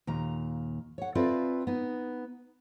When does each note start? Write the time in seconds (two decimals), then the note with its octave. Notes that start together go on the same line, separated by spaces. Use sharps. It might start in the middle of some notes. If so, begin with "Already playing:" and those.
0.07 D#2 A#2 A#5
0.98 C#5 F#5
1.15 C4 F4 A4 B4 D5 E5
1.67 B3 D#4